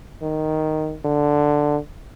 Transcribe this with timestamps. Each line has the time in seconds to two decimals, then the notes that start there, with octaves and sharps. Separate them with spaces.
0.22 D#3
1.05 D3